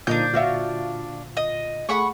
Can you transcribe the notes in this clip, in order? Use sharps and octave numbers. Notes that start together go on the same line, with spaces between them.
A#2 D3 F3 D4 D#4 G6
F4 F#4 E5
D#5
A3 G#4 F#5 B5 C#6